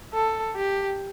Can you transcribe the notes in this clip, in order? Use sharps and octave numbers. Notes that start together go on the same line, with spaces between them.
A4
G4